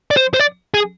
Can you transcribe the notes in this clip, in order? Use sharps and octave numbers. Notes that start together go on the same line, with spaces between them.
D5
C5
C5
D5
G#4